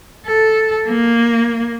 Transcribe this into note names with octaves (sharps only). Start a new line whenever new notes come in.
A4
A#3